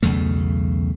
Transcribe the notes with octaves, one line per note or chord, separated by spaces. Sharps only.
B1 E2 C#3 A3